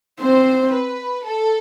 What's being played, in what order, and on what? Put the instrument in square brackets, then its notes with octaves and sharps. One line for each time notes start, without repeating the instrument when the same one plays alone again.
[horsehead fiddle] C4 [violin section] C5
[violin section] B4
A4